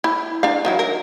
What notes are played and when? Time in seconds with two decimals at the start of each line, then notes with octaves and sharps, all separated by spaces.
0.04 E4
0.43 D4 F5
0.65 D#3 F#3 E4
0.79 A#4